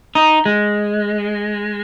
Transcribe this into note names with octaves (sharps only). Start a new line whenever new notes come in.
D#4
G#3